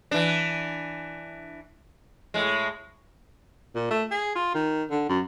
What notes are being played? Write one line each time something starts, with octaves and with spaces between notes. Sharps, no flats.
E3 D4
A2 G#3
A#2
A3
G#4
F4
D#3
D3
F#2